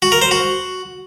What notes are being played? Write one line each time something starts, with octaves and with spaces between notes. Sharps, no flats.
F#4
A#4
C5
F#4